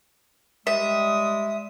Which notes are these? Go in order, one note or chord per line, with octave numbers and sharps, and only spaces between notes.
G3 G#3 E5 D#6